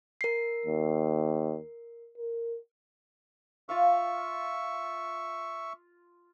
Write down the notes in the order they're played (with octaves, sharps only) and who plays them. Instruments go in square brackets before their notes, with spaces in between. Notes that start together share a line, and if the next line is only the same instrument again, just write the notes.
[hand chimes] A#4 C7
[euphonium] D#2
A#4
[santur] F4 F5 [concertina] E5 C#6